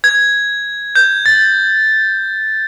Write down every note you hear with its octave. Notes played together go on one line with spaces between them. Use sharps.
G#6
G6
A6